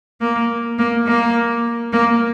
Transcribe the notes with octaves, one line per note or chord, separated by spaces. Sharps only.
A#3
A#3
A#3
A#3